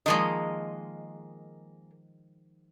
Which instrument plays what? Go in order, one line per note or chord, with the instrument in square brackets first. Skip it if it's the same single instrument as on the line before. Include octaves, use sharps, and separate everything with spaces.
[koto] D#3 F3 G#3 [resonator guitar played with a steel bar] A#3 G#4 D#5